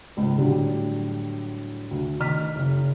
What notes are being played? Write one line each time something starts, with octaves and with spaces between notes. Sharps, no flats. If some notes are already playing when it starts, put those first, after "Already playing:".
C#2 G#2
A2 D3 F#3 G3
D2
D#3 F6 B6
F#1